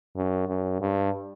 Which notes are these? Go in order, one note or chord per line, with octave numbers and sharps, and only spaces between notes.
F#2
F#2
G2